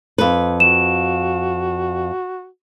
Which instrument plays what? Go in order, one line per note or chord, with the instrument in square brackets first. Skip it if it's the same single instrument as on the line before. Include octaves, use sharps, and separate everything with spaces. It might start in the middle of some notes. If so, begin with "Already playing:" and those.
[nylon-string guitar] F2 B4
[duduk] F#4 [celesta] E7